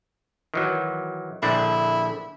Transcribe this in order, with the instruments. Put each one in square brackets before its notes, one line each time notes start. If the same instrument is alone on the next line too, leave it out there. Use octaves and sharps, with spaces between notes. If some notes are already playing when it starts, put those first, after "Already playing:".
[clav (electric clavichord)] D#3 E3 F#3
[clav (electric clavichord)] A#1 D3 D4 [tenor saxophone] E4